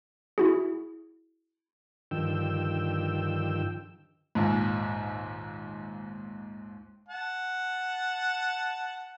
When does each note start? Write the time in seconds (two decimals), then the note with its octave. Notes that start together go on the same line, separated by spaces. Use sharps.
0.38 E4 F#4 G#4
2.11 G2 D3 D#3 F3 G5 E6
4.35 A#1 D#2 G#2
7.09 F#5 A5